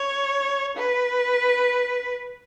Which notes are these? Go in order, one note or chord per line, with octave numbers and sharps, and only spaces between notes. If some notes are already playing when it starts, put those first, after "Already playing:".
Already playing: C#5
B4